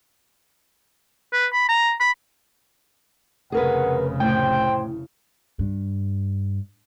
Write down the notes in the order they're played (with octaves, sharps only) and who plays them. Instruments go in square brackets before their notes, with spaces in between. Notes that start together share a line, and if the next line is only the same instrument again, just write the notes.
[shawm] B4
B5
A#5
B5
[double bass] F1 C#3 [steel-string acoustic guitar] G#4 A#4 B4 [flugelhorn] F#5
[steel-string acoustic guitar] A2 [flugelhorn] C5 [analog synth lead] G5
[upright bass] G2